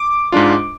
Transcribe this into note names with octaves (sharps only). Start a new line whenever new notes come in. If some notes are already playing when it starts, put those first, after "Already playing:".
Already playing: D6
G#2 G#3 D4 F4